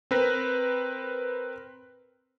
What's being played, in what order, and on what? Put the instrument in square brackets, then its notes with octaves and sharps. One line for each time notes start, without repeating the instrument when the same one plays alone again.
[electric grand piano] C4 A#4 B4